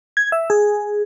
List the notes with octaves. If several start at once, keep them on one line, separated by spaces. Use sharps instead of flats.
G#6
E5
G#4